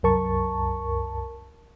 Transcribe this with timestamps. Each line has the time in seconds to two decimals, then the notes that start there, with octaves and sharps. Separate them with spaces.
0.03 C2 F#2 A#4 A5 C#6